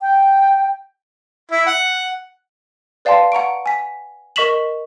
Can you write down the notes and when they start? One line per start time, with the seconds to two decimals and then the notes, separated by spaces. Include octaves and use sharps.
0.01 G5
1.52 E4
1.67 F#5
3.05 B4 D5 F5 G5 A5 C6
3.32 F#5 A#5 C#6 D7
3.66 G#5 B6
4.36 A#4 D#5 C#6 B6 E7 F#7